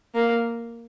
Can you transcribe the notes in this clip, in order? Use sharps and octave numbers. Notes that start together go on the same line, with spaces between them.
A#3